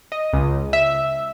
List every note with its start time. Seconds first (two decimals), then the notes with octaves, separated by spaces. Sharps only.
0.12 D#5
0.33 C#2
0.73 E5